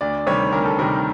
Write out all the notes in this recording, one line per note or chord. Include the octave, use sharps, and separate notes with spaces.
D2 D5
C3 D#3 G3 C#5
D2 A#4
A4
C3 D#3 G3 A#4